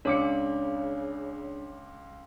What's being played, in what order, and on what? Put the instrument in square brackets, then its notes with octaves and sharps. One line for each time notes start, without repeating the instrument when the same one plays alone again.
[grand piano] C#2 D6 C#7 [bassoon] C#3 [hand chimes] D4 C#5